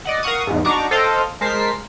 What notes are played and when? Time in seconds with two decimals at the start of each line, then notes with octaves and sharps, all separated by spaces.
0.05 D5 D#5 F#5
0.23 A#4 F5 F#5 C#6 D#6
0.47 E2 G#2
0.65 D4 D#4 F#4 A#5 C#6 D6
0.91 A4 C5 D#5 F5 G5
1.41 G#3 A#4 C5 A5 B6 C7